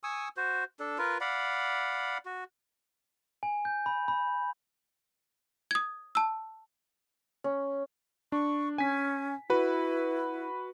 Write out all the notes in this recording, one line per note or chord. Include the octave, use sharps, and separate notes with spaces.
G#5 C#6 D#6 E6
F#4 C5
D4 A4
F4 A#4 B4
D5 F5 F#5 B5
F#4
G#5
G6
B5
B5
D#6 G#6
A5 E6
C#4
D4 C#6
C#4 G#5 B6
E4 F#4 B4